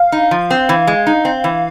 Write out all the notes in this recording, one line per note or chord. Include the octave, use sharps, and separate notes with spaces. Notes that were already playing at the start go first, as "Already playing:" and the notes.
Already playing: F5
D#4
F3
C4
E3
G#3
D#4
C4
E3